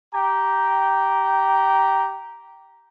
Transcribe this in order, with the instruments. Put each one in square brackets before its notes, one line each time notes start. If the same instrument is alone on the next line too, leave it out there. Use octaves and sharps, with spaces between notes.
[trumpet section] G4 G5 A#5